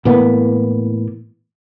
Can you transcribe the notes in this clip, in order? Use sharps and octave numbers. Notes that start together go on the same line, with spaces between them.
A2 E3 A#3 B3